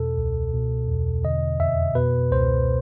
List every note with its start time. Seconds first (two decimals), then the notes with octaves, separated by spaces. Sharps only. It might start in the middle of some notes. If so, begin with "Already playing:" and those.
Already playing: E2 B2 A4
0.18 C#2
0.53 B2
0.88 E2
1.24 D3 D#5
1.60 F2 E5
1.95 B2 B4
2.31 C#2 C5